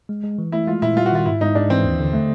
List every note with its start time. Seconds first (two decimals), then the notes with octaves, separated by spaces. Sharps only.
0.09 G#3
0.24 G#3
0.39 E3
0.52 A3 E4
0.67 G#3 F4
0.82 A#2 E4
0.97 G3 F4
1.06 F#4
1.12 D#3 F4
1.26 G#2 E4
1.41 G#2 D#4
1.55 G#3 D4
1.70 E3 C4
1.84 D#2
2.00 D3
2.14 A3